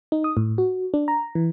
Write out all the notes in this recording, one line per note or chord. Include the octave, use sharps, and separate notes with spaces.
D#4
D#6
A2
F#4
D4
A#5
E3